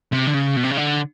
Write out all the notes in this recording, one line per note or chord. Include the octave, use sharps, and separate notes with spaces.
C3
D3
C#3
B2
C3
C#3
D3